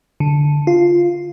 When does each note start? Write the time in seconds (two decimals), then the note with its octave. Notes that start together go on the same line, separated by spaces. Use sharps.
0.20 D3
0.67 F4